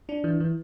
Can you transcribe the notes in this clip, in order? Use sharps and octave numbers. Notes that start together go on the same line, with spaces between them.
D4
E3
E3